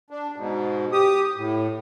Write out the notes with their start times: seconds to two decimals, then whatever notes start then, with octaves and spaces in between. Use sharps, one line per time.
0.10 D4
0.36 G#2 B2
0.92 G4 D#6
1.37 A2